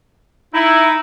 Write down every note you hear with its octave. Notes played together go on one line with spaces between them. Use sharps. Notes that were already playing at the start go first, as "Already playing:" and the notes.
D#4 E4